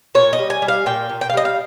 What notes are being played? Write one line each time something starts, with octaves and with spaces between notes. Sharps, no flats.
A#2 C#5
D#5
G3
G#5
G3
F5
A#2 G5
A#2
G5
F5
G3 D#5
F5